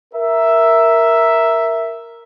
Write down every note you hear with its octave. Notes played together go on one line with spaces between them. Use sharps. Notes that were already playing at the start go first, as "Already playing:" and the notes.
A#4 E5